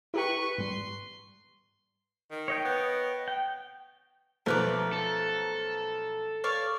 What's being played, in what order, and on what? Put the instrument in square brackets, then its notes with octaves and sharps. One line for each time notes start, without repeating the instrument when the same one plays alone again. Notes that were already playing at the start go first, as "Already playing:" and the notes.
[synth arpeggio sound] E4 G4 G5 [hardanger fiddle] B4 C#6
[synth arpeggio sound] G#2 G3 [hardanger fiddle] C6
[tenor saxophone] D#3
[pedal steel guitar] C#5 D#5 G5
[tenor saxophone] B3
[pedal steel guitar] G5
[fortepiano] B1 F3 A3 [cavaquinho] A#4 B4 D6
[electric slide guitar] A4
[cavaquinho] C#5 D5 F5